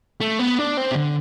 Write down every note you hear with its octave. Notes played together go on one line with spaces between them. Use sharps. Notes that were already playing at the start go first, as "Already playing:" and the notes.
A3
B3
D4
C4
C3
D3